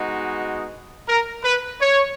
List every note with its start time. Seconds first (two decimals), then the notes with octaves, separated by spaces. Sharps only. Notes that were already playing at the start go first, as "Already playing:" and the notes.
Already playing: G#3 B3 D#4 F#4
1.08 A#4
1.44 B4
1.80 C#5